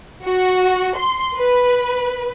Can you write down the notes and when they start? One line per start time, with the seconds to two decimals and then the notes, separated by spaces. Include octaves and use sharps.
0.24 F#4
0.96 C6
1.36 B4